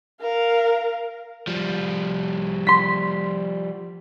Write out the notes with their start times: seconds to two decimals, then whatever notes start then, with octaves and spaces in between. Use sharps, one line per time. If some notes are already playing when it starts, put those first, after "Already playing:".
0.21 A#4 F5
1.47 F3 G3
2.67 C6 B6